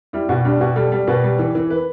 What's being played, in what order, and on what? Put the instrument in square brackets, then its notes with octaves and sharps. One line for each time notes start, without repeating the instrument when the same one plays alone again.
[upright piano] G3 E4
B2 F#4
G3 D4
B2 F#4
G3 A4
G3
B2 B4
G3
E3
E3
B4